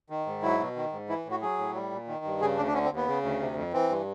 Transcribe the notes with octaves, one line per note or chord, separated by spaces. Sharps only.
D#3
G#2
F#3 E4
B2
D#3
G#2
E3 E4
A2
F#4
F#3 G#4
A2
G3
A#2
D#3
G2
C#3 G#4
D2 D4
D4
D3 C#4
C4
D#2 B3
C#3
D2
C3
F2
E3 C4
G2